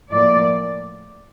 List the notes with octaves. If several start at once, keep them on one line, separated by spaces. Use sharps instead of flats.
A2 F3 A#3 D5